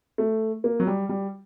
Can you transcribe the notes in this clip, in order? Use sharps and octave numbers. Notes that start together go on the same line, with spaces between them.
A3
A#3
F#3
G3
G3